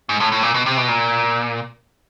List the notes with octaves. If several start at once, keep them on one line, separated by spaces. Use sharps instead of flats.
G#2
A2
A2
A#2
B2
C3
B2
A#2